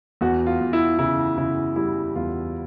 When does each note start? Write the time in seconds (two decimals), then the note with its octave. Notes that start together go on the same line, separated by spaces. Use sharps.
0.21 E2 F#4
0.46 F4
0.61 E2
0.73 E4
0.99 C#3 E4
1.38 C#3 E4
1.76 G3 E4
2.16 E2 F4